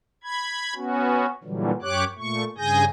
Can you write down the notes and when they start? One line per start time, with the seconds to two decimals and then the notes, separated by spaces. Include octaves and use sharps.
0.24 B5 G#6
0.75 B3 C#4 F#4
1.44 A#2 D3 E3 F#3 G3
1.82 F#2 G4 C#5 D6 F#6
2.19 A#2 A3 C#6
2.58 G2 C#3 G#4 G#5 G6 A#6